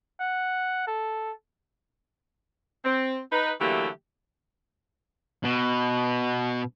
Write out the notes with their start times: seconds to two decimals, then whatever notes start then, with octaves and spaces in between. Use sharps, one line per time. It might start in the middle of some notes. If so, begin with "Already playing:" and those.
0.20 F#5
0.87 A4
2.85 C4
3.32 D#4 B4
3.61 D3 E3 F#3 A3 A#3 G4
5.44 B2